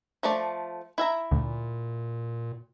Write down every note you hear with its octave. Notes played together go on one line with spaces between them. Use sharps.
F3 A3 D5
E4 E5 A#5
D2 A#2